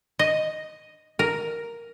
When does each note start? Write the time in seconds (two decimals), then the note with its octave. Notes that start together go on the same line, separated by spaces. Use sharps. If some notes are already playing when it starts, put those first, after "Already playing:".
0.19 D#5
1.19 A#4